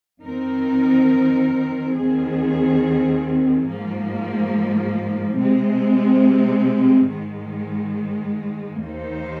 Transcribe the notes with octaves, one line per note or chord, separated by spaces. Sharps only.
F2 D#3 C4 D#4 A#4
D#2 D#3 C4 G#4
G#2 F3 A#3
C3 G#3 C4
G#2 D#3 G#3
D#2 D#3 A#3 D#4 C5